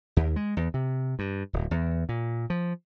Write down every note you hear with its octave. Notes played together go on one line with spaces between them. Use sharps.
D#2
G#3
E2
C3
G2
D1
E2
A#2
F3